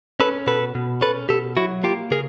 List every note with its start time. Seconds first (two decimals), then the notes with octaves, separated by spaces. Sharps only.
0.20 C#4 A4 B4
0.47 B2 A4 B4
0.75 B2
1.01 C#4 A4 B4
1.29 B2 G4 A4
1.57 F#3 E4 F#4
1.83 A#3 F4 G4
2.11 C#3 G#4 A#4